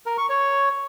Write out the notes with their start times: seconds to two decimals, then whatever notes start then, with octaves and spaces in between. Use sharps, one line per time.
0.06 A#4
0.18 C#6
0.29 C#5